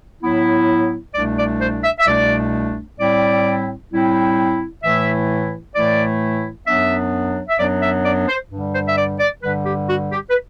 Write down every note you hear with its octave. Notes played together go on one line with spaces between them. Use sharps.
A2 F#3 B3 E4
C2 B2 A3 D4 D5
D5
C5
E5
E5
C2 B2 A3 D4 D5
A2 G3 C4 E4 D5
A2 G3 C4 E4
A2 E3 A3 E4 E5
A2 E3 A3 E4 D5
F#2 F#3 B3 D4 E5
E5
F#2 F#3 B3 D4 D5
E5
D5
C5
G2 D3 G3
C5
E5
D5
D5
G2 D3 G3 B4
G4
F#4
G4
B4